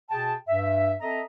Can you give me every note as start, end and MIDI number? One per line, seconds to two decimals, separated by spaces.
0.11 0.34 47
0.11 0.34 68
0.11 0.34 79
0.11 0.34 81
0.49 0.94 43
0.49 0.94 76
1.01 1.21 60
1.01 1.21 69
1.01 1.21 75
1.01 1.21 76
1.01 1.21 82